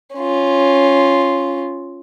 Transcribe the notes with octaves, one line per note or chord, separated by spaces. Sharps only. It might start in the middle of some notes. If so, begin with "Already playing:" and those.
C#4 F4